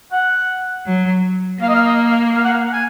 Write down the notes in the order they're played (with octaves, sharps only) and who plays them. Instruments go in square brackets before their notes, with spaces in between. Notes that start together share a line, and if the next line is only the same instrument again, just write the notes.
[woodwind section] F#5
[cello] F#3
[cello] A#3 [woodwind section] F5
[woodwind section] D#5
F5
D#5
F5
F5
F#5
F5
F#5
G#5